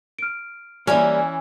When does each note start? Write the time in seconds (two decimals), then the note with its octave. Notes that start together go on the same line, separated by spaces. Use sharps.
0.19 F6 D7
0.87 E3 G3 A#3 C#4 E4 F6